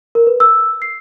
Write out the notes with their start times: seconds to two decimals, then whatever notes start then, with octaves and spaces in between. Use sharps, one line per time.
0.15 A#4
0.27 B4
0.40 E6
0.82 C7